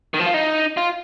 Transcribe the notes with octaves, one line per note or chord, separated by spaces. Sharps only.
D#3
F3
F4
D#4
F4